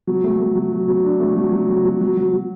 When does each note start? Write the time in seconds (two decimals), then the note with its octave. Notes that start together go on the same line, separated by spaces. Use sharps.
0.07 F#3
0.24 A3
0.40 A3
0.55 F#3
0.72 F#3
0.88 F#3
1.04 D4
1.20 A3
1.36 F#3
1.52 F#3
1.69 F#3
1.85 F#3
2.01 F#3
2.17 F#3
2.33 F#3